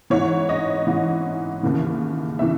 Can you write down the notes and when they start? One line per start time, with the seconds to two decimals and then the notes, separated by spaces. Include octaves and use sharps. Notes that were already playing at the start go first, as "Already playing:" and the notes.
0.10 G#2 E3 C#5
0.49 D#5
0.87 G#2 E3
1.63 D#2 C#3 E3
2.39 C#3 E3 E5